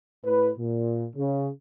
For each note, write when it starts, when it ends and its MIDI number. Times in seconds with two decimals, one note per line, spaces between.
0.24 0.51 45
0.24 0.51 71
0.58 1.07 46
1.16 1.49 49